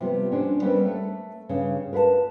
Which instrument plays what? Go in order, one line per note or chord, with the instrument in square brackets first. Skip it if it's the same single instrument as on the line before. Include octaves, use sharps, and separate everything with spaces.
[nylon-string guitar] C3 F3 G3 B3
C#4 D4 C5
G3 B3 C#4 A#4 C5 E5
A3
G2 C#3 C#4
A#4 B4 F5 A5